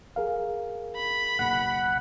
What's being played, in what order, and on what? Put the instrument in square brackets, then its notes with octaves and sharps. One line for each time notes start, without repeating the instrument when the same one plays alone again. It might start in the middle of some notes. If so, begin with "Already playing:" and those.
[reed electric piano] G#4 A#4 F5
[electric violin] B5
[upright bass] F#1 B1 [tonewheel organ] F#5